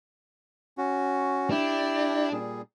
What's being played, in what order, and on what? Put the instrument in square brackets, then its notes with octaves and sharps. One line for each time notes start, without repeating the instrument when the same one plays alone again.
[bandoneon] C#4 F#4
[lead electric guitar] D4 [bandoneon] E4 G4
[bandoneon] A#2 G3 G#4